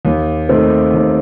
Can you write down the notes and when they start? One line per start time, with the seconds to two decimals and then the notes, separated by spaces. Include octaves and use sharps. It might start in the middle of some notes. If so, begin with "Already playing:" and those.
0.05 D#2
0.49 D#3 A3 C4
0.94 D#2